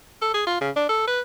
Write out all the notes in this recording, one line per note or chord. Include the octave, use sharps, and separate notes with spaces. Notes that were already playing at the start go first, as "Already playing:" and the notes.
A4
G#4
F4
C#3
D4
A4
B4